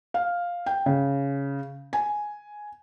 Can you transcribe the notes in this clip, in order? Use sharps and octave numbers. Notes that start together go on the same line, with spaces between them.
F5
G5
C#3
G#5